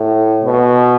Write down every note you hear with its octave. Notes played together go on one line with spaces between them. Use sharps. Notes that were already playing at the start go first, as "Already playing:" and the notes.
Already playing: A2
B2